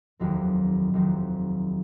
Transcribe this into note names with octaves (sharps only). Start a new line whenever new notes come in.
F1 D#2 D#3 F#3 C4
F1 D#2 D#3 F#3 C4